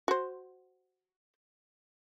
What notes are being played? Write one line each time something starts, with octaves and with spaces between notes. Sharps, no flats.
F#4 C5